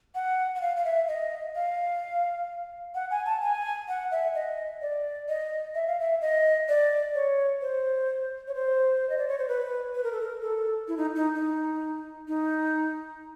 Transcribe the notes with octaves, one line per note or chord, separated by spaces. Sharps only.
F#5
F#5
F5
F5
E5
D#5
F5
F#5
G#5
A5
G#5
F#5
E5
D#5
D5
D#5
E5
F5
E5
D#5
D5
C#5
C5
C#5
C5
D#5
D5
C#5
C5
B4
B4
A#4
A4
A#4
A4
E4
D#4
D#4
D#4
D#4